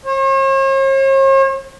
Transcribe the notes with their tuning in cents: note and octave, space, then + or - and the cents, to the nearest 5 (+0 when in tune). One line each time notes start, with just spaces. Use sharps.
C#5 -45